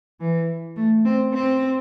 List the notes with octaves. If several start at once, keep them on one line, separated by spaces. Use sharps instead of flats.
E3
A3
C4
C4